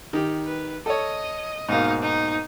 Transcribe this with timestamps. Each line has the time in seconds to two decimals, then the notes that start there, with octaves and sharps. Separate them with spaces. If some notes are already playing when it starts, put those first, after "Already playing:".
0.13 D#3 G4
0.46 B4
0.86 A4 C#5 D#5
1.69 G#2 B2 A#3 D#4 F5
2.02 D#4